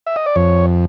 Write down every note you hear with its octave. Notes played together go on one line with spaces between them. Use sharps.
E5
D#5
D5
F2 C#5